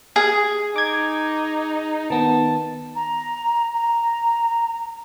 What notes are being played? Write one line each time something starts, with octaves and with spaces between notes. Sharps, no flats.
G#4
D#4 D6 G#6
D#3 B3 A5
A#5
A#5